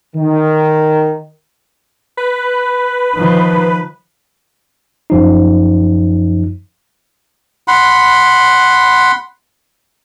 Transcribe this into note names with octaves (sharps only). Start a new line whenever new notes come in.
D#3
B4
D#3 F3
F#2 F3 D#4
F#5 B5 C6